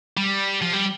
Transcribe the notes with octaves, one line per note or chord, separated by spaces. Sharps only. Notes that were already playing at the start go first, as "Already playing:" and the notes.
G3
F3
G3